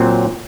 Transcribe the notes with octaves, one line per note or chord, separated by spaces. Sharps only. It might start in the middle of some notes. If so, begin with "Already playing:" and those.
Already playing: A#2 F#3 C4